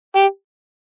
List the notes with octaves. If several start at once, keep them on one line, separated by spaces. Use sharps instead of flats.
G4